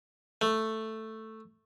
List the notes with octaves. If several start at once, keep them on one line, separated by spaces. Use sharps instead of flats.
A3